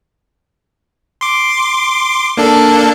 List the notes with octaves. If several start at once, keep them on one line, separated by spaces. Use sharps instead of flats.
C6 D6
A#3 D4 A4